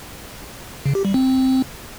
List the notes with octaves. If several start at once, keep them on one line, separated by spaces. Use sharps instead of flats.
C#3
G4
G3
C4